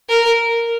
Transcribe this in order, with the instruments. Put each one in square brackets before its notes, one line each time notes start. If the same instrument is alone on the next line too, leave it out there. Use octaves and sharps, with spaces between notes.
[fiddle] A#4